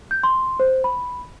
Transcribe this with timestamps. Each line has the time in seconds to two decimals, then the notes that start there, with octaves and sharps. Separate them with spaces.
0.11 G6
0.23 C6
0.60 C5
0.84 B5